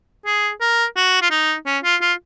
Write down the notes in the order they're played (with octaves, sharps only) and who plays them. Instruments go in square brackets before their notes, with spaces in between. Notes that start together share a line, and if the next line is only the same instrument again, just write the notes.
[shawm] G#4
A#4
F#4
F4
D#4
C#4
F4
F4